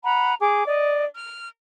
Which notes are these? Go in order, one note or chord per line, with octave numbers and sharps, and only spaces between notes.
F#5 A#5 B5
G#4 D6
D5 D#5
F6